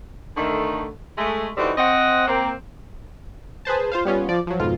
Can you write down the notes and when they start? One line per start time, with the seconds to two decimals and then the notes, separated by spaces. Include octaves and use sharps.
0.37 D3 D#3 A3
1.18 G#3 A3
1.57 D3 E3 G3 C4 D#4 F#4
1.78 C4 D#5 F#5
2.28 A#3 C4
3.65 G#4 B4 C5 A5
3.92 F4 C5 F5
4.05 G3 B3 C#4 F4
4.29 F3 D5
4.47 F3 F#3
4.59 F2 G#2 B2 F4